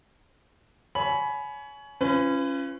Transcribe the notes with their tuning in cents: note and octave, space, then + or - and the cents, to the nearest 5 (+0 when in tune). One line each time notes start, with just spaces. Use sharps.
C#5 +25 G#5 +30 B5 +0
C#4 -10 F4 -30 B4 +30